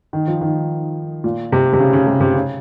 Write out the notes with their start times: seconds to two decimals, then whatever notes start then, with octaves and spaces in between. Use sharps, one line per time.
0.13 D#3
0.27 F3
0.41 D#3
1.24 A#2
1.52 C3
1.73 C3
1.79 C#3
1.93 C#3
2.07 C3
2.20 C3
2.34 C#3